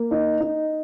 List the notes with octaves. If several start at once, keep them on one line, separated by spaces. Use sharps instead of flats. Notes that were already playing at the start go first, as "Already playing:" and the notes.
Already playing: A#3
D#4
D#4